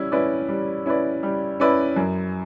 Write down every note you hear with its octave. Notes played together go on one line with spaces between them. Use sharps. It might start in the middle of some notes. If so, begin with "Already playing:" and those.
Already playing: G3 C#4 E4
C#4 E4 B4 D5
G3
C#4 E4 B4 D5
G3
C#4 E4 B4 D5
F#2